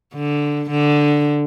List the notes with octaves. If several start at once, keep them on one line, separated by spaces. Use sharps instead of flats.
D3
D3